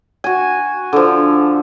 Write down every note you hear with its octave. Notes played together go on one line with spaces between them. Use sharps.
F#4 G#5
D3 F3